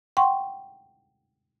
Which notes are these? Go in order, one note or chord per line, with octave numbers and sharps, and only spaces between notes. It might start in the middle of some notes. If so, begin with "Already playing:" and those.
F#5 G5 C6 C#6